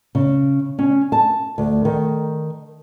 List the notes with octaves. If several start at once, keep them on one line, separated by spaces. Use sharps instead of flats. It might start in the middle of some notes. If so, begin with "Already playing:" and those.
C#3
C#4
A5
D2
D#3